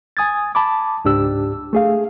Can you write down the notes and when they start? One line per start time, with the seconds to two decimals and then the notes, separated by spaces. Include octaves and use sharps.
0.17 G#5 D#6 G#6 A6
0.55 A5 B5 D6
1.05 C#2 G#2 D4 G4 E6
1.73 A3 G#4 F5